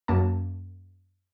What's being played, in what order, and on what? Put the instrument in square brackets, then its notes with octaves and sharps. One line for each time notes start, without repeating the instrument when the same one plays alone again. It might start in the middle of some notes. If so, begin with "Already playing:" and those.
[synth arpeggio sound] F#2 A#3 A5